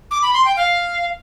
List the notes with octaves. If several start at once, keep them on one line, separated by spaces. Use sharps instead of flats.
D6
B5
C6
G5
F5